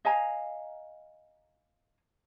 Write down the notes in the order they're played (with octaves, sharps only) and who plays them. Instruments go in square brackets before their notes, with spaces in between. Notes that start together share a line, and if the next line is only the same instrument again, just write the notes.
[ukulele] D#5 F5 G#5 A#5